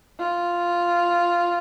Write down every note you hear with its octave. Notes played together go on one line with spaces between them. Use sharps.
F4